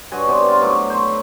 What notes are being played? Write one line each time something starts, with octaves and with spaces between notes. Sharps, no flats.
G2 F#4 C#5 G#5
C3 B3 C5 D5
F4
A2 F#3 C#6 D6
C5 C#5
B5